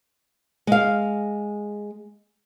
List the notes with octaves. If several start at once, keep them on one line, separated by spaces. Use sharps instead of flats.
G#3 F5